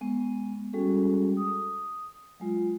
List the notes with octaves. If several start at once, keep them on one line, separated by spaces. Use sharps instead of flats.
G#3 B3
G3 G#3 C#4 F#4 G#4 A4
D#6
F#3 G#3 F4